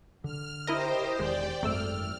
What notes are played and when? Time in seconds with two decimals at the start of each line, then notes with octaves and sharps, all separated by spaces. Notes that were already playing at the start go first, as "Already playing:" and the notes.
0.24 D3 F6
0.67 E4 G4 A#4 C5 D#5
1.19 E1 D#3 G#3 D5 G5
1.62 G#1 F#2 A3 E6 F6